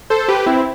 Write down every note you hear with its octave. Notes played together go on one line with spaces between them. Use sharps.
A4 C5
G4 B4
C4 E4